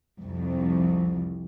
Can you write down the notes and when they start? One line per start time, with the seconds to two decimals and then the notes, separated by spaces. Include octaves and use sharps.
0.20 C2 F2